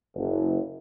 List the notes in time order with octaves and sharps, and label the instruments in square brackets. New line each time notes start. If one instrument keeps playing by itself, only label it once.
[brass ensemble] F#1